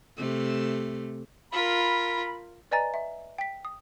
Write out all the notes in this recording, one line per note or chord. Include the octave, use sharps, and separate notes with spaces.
C3 A3
F4 A#4 B5
B4 D5 D#5 G#5 A#5 A6
E5
G5 B6
D#6